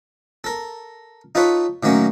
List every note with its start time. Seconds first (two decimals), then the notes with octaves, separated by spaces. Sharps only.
0.44 A4 A#4
1.35 D#4 F4 A4 B4 C#5
1.83 A2 D#3 F#3 A#3 C#4